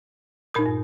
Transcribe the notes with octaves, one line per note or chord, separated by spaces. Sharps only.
A#2 D#4 A#4 D#6 G6
G2